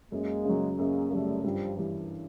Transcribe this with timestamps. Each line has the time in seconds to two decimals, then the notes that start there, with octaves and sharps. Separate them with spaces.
0.12 F#2 G#3 A#3
0.45 C#3 F#3
0.78 F#2 G#3 A#3
1.11 C#3 F#3 G3 A3
1.44 G2 F3 G3
1.77 E3 G3